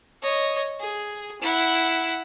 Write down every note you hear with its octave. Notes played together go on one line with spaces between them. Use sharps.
C#5 D#5
G#4
E4 F#5